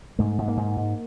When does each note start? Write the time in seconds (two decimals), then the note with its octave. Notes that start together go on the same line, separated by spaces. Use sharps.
0.19 G#2 A3
0.38 G#2
0.48 A#3
0.57 G#2
0.77 G#2